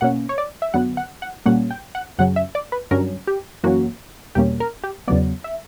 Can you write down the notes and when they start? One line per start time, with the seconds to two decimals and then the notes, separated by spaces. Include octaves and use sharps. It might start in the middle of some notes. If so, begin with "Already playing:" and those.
0.01 B2 A#3 C#4 F#5
0.29 C#5
0.38 D5
0.62 E5
0.74 F#2 D3 F#3 B3 F#5
0.97 F#5
1.22 F#5
1.46 A#2 G3 A#3 C#4 F#5
1.71 G5
1.95 F#5
2.18 F#2 C#3 F#3 C#4 F#5
2.36 E5
2.55 D5
2.72 B4
2.91 G2 D3 F#3 C#4 A#4
3.27 G4
3.63 F#2 E3 A#3 C#4 F#4
4.35 E2 B2 G3 A#3 C#4 G4
4.60 A#4
4.83 G4
5.08 E2 C#3 F#3 B3 D5
5.44 E5